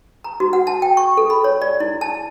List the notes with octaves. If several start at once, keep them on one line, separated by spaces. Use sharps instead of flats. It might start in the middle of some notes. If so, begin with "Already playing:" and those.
A#5
F#4
F#5
A5
G5
C#6
A4
B5
C#5
D5
E4
A5